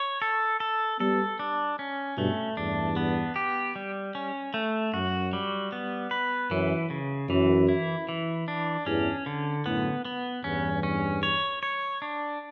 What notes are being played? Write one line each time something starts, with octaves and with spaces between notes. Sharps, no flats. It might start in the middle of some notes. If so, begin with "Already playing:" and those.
Already playing: C#5
A4
A4
G3 B3 A4
D4
C#4
G2 B2 A3
E2 G2 D4
B3
G4
G3
C#4
A3
F#2 F#4
G3
B3
B4
F#2 E3
C#3
F#2 E3
E4
E3
D4
E2 G2 C#4
D3
F#2 A2 B3
B3
E2 G2 C#4
C#4
C#5
C#5
D4